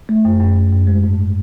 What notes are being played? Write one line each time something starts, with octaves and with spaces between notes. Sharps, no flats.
A3
F#2
F#2
F#2
F#2
G#3
G#2